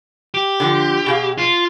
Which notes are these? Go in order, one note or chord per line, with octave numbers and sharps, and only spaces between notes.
G4
D3 E3 F3
B2 G#4 F5
F4